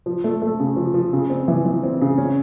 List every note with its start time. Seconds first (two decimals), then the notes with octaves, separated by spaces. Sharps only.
0.06 F3
0.24 A3
0.42 A3
0.60 C#3
0.76 F3
0.94 F3
1.13 C#3
1.30 C4
1.48 E3
1.66 E3
1.84 C4
2.01 C#3
2.18 C#4